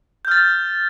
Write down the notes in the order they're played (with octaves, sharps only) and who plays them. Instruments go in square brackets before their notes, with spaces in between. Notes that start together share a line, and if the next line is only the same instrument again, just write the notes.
[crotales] G6
F6
A6